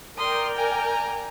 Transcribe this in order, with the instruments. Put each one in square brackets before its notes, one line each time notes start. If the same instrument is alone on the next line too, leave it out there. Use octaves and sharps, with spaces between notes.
[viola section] A#4 D5 G5 [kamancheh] C6 D#6
[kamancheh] G#5 A#5